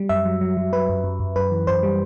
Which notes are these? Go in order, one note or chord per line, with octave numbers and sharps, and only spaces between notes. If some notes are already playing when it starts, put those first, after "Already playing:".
Already playing: G3
F#2 E5
F#3
F#3
F#3
F#3 B4
F#2
F#2
F#2
F#2 B4
E3
F#2 C5
G3